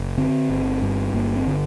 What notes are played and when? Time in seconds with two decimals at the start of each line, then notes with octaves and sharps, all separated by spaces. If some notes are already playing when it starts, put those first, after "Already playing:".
Already playing: F#1
0.17 D3 C4
0.49 G1
0.82 G2
1.14 G1 A#3
1.36 C4
1.47 D3